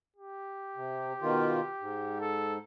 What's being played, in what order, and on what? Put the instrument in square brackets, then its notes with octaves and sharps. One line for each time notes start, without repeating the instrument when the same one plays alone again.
[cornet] G4
[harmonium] C3
B2 D#3 F4
G#2
[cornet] A4